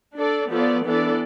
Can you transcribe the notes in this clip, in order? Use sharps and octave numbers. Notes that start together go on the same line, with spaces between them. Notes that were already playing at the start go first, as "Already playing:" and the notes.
D4 A4 D5
F3 B3 F4 A4 D5
E3 B3 D4 A4 D5